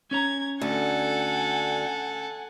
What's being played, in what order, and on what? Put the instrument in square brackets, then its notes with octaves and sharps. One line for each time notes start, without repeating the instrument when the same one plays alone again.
[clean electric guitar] C#4 C#5 A#5 [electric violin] G#6
[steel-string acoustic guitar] D2 [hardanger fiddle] A4 [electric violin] F#5 G#5